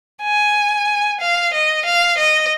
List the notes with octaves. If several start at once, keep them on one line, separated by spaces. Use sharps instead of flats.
G#5
F5
D#5
F5
D#5